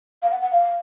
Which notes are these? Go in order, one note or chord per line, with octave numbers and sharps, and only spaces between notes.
F5
F#5
F#5
F5